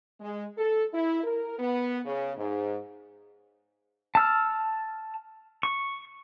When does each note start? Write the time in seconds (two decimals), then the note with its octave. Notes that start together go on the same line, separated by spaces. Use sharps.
0.20 G#3
0.58 A4
0.94 E4
1.24 A#4
1.59 B3
2.05 C#3
2.37 G#2
4.15 A5 E6 F6
5.63 C#6